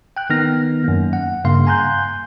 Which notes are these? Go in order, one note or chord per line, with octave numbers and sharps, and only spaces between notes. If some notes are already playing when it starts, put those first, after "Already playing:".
G5 F#6
D#3 B3 D#4 F6 A#6
F#2 A#3
F#5
G2 C#3 A#3 F5 C6
G#5 A#5 C6 F#6 G6